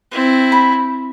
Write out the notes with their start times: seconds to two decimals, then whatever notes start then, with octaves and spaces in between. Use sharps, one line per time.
0.11 C4 E4
0.52 B5